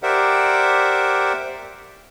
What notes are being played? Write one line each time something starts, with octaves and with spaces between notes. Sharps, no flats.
G4 A#4 C5 D5 E5 F#5